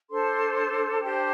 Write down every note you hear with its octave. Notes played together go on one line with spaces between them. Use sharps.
D4 A4 C5 C6
D4 G4 C5 G5